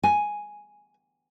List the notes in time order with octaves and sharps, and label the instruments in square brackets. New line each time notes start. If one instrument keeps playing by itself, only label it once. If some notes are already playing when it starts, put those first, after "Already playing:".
[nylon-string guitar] G#5